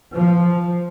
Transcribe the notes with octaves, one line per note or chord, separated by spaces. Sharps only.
F3